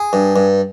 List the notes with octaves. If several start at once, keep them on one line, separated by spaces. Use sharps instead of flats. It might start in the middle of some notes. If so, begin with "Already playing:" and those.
Already playing: G#4
G2
G2